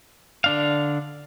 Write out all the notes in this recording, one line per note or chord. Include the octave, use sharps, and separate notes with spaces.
D3 D4 F5